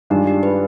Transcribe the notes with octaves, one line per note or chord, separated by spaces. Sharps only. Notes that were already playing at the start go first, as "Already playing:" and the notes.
G2 D#3 G#3 D4 F4 G4
G4
B4